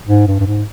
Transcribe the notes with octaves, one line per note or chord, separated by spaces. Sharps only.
G#2
G2
G2
G#2